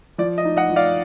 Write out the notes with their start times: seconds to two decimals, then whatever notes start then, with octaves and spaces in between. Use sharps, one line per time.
0.18 F3 D5
0.38 D#5
0.45 D#4
0.57 D#5 F#5
0.70 F3
0.76 D5 F5